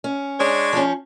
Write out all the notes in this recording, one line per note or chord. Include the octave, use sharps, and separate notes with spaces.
C#4
G#3 D4 C#5
F3 C#4